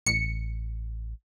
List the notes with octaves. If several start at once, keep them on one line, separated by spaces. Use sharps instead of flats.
A1 C#7